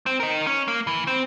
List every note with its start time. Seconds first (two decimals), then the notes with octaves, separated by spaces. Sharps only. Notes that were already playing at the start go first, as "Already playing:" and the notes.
0.06 C4
0.20 A#4 D#5
0.47 C#4
0.68 A#3
0.87 E3
1.07 C4